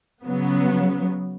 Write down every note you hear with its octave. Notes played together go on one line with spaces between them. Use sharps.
C#3 F#3 B3